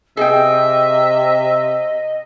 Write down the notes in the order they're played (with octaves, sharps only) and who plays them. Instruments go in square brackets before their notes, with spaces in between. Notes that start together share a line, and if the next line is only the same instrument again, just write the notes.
[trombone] C3 [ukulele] G#4 G5 [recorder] D#5 [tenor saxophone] E5